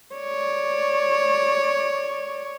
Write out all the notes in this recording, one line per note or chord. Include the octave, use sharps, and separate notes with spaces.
C#5 D5